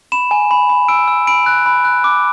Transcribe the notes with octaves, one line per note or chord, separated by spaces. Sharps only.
B5 E7
G#5
B5
B5
E6 D7
E6
B5 D7
F#6
B5
F#6
D6